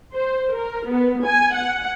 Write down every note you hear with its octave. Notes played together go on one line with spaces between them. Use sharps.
C5
A#4
B3
G#5
F#5